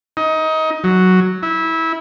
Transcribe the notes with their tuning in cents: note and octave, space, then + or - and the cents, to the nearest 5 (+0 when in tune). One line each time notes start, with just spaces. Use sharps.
D#4 +25
F#3 +0
E4 -20